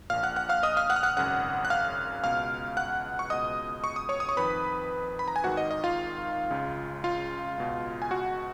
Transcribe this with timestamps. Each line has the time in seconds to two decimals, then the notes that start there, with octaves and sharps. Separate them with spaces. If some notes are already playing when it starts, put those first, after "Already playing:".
0.10 A#1 A#2 F5 F6
0.23 F#5 F#6
0.36 F#5 F#6
0.49 F5 F6
0.63 D#5 D#6
0.77 F5 F6
0.90 F#5 F#6
0.96 F6
1.03 F#5 F#6
1.17 G#1 F#2 C#3 F#5 F#6
1.65 F#6
1.70 F5 F6
2.23 C#2 B2 F5 F6
2.77 F#5 F#6
3.19 C#6
3.30 C#2 B2 D#5 D#6
3.84 C#6
3.96 D#6
4.09 C#5 C#6
4.20 D#6
4.29 C#6
4.37 F2 D#3 B4 B5
5.19 B5
5.28 A#5
5.36 G#5
5.44 G#1 G#2 D#3 F#4 F#5
5.57 D#5
5.71 D#5
5.84 F4 F5
6.50 C#2 C#3
7.04 F4 F5
7.58 C#2 B2
8.02 G#5
8.11 F#4 F#5